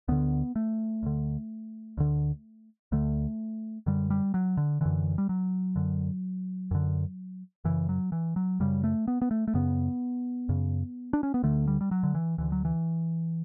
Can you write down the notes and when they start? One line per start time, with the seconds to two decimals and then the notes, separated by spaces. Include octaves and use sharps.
0.08 D2 D3 B3
0.56 A3
1.03 D2 D3
1.98 D2 D3
2.92 D2 D3 A3
3.86 F#2 D3 G3
4.10 G3
4.34 F#3
4.57 D3
4.81 F#2 D3 E3
5.18 G3
5.29 F#3
5.76 F#2 D3
6.71 F#2 D3
7.65 F#2 C#3 E3
7.89 F#3
8.12 E3
8.36 F#3
8.60 F#2 C#3 G3
8.84 A3
9.08 B3
9.22 B3
9.31 A3
9.48 A3
9.54 F#2 C#3 B3
10.49 F#2 C#3
11.13 D4
11.23 C#4
11.34 B3
11.43 D2 D3 A3
11.67 G3
11.81 G3
11.91 F#3
12.03 D3
12.15 E3
12.38 D2 D3 E3
12.52 F#3
12.65 E3